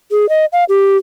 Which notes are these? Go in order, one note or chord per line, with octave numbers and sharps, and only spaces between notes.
G#4
D#5
F5
G4